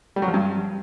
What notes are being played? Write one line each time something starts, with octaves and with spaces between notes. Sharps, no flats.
G3
F#3
F3
G2